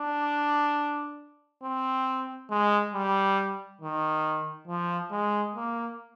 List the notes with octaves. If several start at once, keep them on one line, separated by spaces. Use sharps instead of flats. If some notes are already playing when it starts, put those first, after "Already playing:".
Already playing: D4
C4
G#3
G3
D#3
F3
G#3
A#3